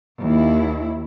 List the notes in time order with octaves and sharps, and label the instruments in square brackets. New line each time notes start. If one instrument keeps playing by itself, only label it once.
[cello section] D#2 E4